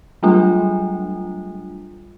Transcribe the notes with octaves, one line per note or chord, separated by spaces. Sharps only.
F#3 G3 A3 D4 F4